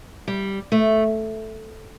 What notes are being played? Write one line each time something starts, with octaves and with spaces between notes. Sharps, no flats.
G3
A3